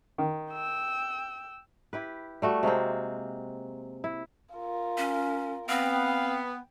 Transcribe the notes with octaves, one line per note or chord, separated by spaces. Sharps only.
D#3
G5 E6
E4 G4 B4
G3 A3 F#4
C3 G#3 A#3 C4
E4
F4 A#4
C#4
B3 C4 F5 G5